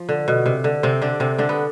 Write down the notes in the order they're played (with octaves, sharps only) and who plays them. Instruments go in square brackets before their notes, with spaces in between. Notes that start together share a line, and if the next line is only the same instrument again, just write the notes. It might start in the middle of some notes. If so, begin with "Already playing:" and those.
Already playing: [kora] F3
D3
B2
C3
D3
C3 C4
D3 D4
C3 C4
D3 D4
B3